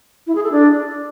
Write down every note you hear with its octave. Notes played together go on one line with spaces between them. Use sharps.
E4
G#4
A4
D4